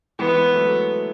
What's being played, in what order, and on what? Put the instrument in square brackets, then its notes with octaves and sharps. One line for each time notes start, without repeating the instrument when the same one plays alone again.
[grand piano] E3 G#3 [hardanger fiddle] B3
[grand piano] F#3 A3